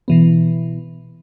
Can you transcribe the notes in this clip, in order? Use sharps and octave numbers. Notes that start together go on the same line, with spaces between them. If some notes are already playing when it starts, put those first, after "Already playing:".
B2 E3 B3